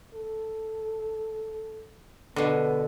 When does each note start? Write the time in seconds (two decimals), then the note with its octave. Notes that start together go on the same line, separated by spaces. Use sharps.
0.15 A4
2.36 B2 D3 B3